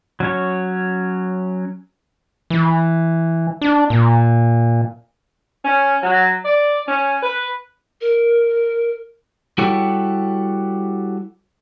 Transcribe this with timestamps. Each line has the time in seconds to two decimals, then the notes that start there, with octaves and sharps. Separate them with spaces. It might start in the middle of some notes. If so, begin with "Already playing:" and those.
0.20 F#3 C#4 C#5
2.50 E3
3.61 D4
3.90 A#2
5.64 C#4
6.03 F#3
6.45 D5
6.88 C#4
7.23 B4
8.01 A#4
9.58 G3 E4 F#4 G4 A4 C#5